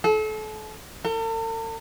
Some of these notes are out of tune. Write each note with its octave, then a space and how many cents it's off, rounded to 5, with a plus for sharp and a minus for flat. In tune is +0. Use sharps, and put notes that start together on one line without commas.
A4 -35
A4 +45